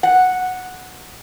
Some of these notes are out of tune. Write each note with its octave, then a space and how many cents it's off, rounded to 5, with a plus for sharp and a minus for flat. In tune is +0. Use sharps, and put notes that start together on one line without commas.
F#5 -5